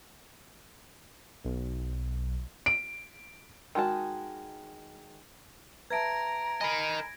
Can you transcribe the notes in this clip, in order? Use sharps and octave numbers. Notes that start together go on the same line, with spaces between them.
B1
D7
D#3 G#3 F#4 A5
B4 E5 A5 A#5 G#6 A#6 D7
A#4 D#5 G#5 B5